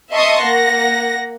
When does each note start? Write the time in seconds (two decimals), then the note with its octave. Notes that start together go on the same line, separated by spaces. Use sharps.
0.11 D#5 E5 A5 C6 C#6 D#6
0.42 A#3 F#5 A#6